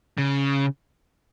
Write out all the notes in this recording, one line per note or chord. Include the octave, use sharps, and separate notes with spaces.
C#3